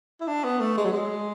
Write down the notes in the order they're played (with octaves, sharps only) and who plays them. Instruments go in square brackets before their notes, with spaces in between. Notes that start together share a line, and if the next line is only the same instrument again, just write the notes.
[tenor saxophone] E4
D4
B3
A3
G#3
F#3
G#3